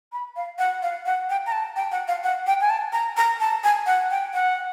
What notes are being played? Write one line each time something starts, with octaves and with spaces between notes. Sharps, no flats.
B5
F5
F#5
F5
F#5
G5
A#5
A5
G5
F#5
F5
F#5
G5
G#5
A5
A#5
A#5
A5
G#5
F#5
G5
F#5